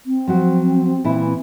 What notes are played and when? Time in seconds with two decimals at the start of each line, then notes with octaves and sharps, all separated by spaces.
0.06 C4
0.27 F3 F#3 F#4
1.04 A#2 E3 E4